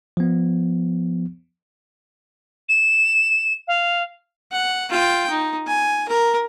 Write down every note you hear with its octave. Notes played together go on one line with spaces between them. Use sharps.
F3 B3
E7
F5
F#5
F4 G5
D#4
G#5
A#4